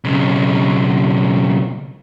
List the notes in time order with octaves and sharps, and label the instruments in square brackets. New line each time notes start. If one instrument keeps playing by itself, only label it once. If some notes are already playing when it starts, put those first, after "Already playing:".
[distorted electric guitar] B1 C#3